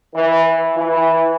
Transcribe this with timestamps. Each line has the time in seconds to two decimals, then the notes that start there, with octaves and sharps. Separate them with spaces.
0.16 E3
0.75 E3